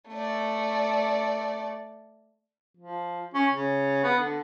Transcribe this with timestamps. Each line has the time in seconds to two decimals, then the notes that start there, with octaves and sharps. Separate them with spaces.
0.10 A3 D5
2.77 F3
3.34 C#4
3.53 C#3
4.03 B3
4.19 D3